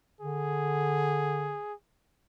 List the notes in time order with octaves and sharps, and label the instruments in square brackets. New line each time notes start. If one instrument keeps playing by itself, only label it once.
[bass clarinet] D3 [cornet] G#4